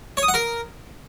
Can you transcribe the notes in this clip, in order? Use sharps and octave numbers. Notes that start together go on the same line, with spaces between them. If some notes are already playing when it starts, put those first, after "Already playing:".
C#5
D#6
F#5
A#4